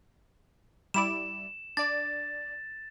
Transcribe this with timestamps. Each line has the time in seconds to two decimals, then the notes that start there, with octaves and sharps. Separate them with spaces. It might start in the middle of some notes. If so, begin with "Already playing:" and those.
0.94 G3 E4 D5 E7
1.77 D4 D5 A6